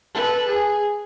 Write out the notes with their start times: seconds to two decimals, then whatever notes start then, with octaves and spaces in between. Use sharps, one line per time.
0.14 A4 B4
0.47 G#4